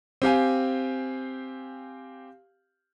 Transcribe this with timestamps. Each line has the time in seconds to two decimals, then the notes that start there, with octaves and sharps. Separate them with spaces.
0.22 C4 G4 F5 G#5